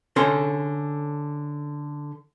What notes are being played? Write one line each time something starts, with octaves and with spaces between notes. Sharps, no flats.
D3 C#4 A4 C6